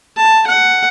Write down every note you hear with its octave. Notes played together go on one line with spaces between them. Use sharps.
A5
F#5